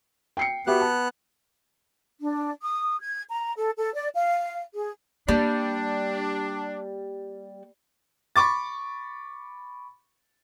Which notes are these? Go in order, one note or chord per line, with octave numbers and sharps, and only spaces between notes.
G5 C7 C#7
B3 F#4 G4 E5 F#6
A5
D4
D#6
G#6
A#5
A4
A4
D5
F5
G#4
G3 A#3 D4
B5 C#6 D6 A6